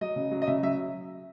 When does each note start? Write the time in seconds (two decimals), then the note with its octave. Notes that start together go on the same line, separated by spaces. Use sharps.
0.01 F#3 D#5
0.16 C#3
0.31 F#3
0.42 D#5
0.47 C#3 E5
0.63 F#3 E5